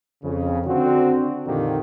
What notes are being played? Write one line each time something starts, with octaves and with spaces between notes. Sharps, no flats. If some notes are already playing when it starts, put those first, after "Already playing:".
F2 C#3
D3 C4 D4 F#4
F2 A#2 D3 D#3 A#3 G4